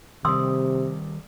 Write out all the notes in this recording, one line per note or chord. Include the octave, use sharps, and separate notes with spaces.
C3 D#3 G3 C6 D#6 E6